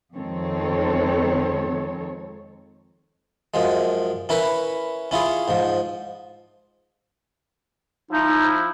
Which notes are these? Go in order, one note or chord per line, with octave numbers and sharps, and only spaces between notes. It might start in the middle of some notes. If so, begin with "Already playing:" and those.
F2 D#3 G#3 C4 A4 C#5
F#2 F3 G#3
C#4 E4 A#4 B4
C#4 E4 F4 G#4
G#2 F3
F3 D#4 E4